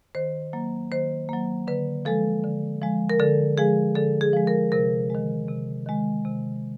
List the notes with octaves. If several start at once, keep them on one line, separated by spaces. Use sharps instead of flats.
D#3 C5
F#3 A#3
D#3 C5
F#3 A#3
D3 B4
F3 G#3 A4
D3
F3 G#3
A#4
D3 A4
F3 G#3 G#4
D3 A4
G#4
F3 G#3
A#4
C3 A#4
D#3 G#3
C3
D#3 G#3
C3